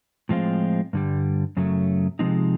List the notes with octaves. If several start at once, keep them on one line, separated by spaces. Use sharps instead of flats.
A2 F3 G#3 C4 F4
G2 D3 G3
F#2 C#3 F#3 A3
C3 F3 G#3 C4 D#4